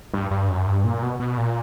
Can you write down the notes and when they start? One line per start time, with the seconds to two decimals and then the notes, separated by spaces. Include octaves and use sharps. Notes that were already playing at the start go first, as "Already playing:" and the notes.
0.14 G2
0.31 G2
0.49 F#2
0.67 G2
0.84 A#2
1.03 B2
1.19 B2
1.37 A#2